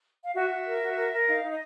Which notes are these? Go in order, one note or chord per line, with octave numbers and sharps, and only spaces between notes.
F5
F#4 E5
F#4
A#4
F#4
A#4
A#4
D#4 F5
D#4
D#5